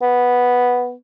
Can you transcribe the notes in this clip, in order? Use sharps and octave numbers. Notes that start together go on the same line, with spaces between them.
B3